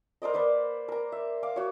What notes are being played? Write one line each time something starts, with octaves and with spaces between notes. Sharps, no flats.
A#4 C5 D5 D#5
A#3 B4 C5 D5
A#4 A#5
E5
F5 D6
F#4 C#5